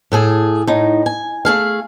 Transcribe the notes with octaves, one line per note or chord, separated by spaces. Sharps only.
A2 A3 G#4
A2 D#4
G#5
A3 G#4 F5